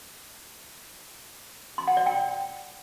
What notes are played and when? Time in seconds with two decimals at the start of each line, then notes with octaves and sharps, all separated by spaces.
1.78 C6
1.88 F#5
1.97 D5
2.06 G5